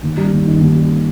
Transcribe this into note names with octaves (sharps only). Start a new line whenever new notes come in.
D#2
G3
D#2
D#3
D#2
G3